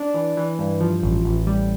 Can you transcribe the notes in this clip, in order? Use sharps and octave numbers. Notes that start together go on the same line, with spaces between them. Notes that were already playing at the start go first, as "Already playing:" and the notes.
Already playing: D4
E3
E3
G2
F3
A1
A1
G3